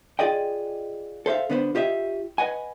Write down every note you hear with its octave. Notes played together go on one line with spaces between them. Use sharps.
F4 G#4 D5 D#5 G5
A4 C5 E5 F5
D3 B3 B4 C5
F4 G4 D#5 E5
B4 D#5 F#5 G#5